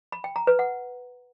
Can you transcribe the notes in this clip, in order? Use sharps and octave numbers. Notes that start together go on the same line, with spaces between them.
B5
G5
A#5
B4
F#5